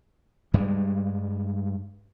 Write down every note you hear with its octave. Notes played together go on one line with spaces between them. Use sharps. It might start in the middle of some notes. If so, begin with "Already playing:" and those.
G2 G3 G#3